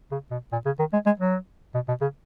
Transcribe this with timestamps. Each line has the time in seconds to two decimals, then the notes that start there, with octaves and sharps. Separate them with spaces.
0.12 C#3
0.31 B2
0.52 A#2
0.65 C#3
0.79 D#3
0.93 G#3
1.06 G#3
1.19 F#3
1.74 B2
1.88 B2
2.02 C#3